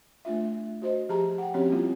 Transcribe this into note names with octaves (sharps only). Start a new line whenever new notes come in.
A3 D4 F4 E5
F#4 C5 D#5
F3 G4 G#4 A5 A#5
F#5 G5
F3 C4 C#4 F#4 G4 C#5
G3 A#3 E4 F4